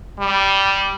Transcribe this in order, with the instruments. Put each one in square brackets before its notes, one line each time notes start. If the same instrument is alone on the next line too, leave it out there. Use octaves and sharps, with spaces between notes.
[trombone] G3